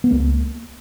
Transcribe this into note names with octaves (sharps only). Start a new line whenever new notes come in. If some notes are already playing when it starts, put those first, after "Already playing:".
B3
C#2 A#3